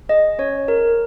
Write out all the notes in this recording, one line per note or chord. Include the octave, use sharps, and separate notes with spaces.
G#4 D#5
C#4 C#5
G#4 A#4